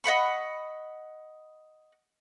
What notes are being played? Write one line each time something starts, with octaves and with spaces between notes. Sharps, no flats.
D#5 F#5 B5 C#6